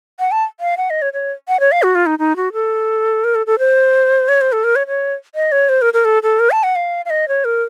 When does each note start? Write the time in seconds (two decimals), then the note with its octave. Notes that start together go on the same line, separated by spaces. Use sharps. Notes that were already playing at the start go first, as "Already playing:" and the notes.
0.20 F#5
0.32 A5
0.60 F5
0.77 F#5
0.90 D#5
1.02 C#5
1.13 C#5
1.48 F#5
1.60 C#5
1.72 F5
1.83 F#4
1.95 F4
2.06 D#4
2.19 D#4
2.36 F#4
2.53 A4
3.24 A#4
3.35 A4
3.47 A4
3.59 C5
4.28 C#5
4.41 C5
4.52 A4
4.64 A#4
4.76 C#5
4.87 C#5
5.35 D#5
5.52 C#5
5.69 C5
5.82 A#4
5.94 A#4
6.05 A4
6.23 A4
6.40 A#4
6.51 A5
6.63 F#5
6.76 F5
7.05 F5
7.10 D#5
7.28 C#5
7.45 A#4